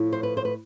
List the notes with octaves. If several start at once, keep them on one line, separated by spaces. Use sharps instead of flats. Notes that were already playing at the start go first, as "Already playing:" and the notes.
Already playing: A2 F3
C5
B4
C5
B4